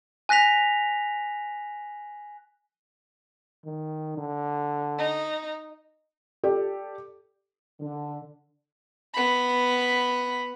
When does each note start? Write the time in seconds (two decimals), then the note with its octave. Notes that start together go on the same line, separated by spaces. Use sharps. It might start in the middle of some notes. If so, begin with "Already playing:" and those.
0.29 G#5 F#6 A#6 B6 F7
3.65 D#3
4.17 D3
4.98 D#4
6.44 G4 A4 D5
7.80 D3
9.14 B3 B5